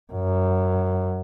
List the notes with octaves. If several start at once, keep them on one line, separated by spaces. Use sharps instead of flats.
F#2